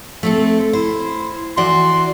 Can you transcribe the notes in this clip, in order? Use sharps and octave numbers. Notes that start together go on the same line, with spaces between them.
A3 C4 A4
E4 C5
E3 F#4 D5 C6